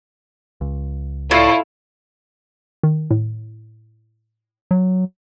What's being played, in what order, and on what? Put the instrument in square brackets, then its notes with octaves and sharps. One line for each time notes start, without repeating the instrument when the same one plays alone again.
[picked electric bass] C#2
[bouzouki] A2 [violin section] E4 F4
[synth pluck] D#3
A2
[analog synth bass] F#3